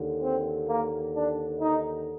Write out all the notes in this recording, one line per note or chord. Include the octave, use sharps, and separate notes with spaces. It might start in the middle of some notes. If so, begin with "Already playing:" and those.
Already playing: D#2 D3
C4
A#3
D4
D#4